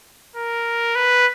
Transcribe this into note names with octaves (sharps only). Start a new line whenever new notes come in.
A#4
B4